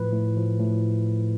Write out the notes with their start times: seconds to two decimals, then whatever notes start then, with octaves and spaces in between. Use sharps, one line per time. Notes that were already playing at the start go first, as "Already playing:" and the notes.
Already playing: A2 F3 B4
0.13 A2
0.37 F3
0.60 A2